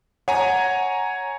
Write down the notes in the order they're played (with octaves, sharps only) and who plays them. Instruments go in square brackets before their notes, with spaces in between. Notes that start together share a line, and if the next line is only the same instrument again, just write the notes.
[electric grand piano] C#5 G#5 A#5 [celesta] F#5